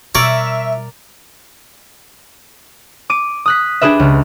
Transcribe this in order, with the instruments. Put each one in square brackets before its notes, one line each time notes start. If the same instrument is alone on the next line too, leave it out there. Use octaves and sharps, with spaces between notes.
[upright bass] B2 G3 [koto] A#4 D5 [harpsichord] C#5 [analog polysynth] E5
[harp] D6 D#7
D#6 F#6 B6
D4 G4 G#4 B4 E5
C#2